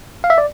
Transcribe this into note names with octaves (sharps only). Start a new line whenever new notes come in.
F5
E5
D5